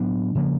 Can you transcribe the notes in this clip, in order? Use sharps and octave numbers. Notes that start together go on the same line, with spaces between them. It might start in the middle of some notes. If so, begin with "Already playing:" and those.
Already playing: A2 F#3 B3 D4
C#3 F3 A#3